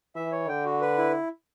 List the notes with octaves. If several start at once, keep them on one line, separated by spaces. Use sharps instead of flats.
E3 E5
C#5
D3 G5
F#4
B4
E4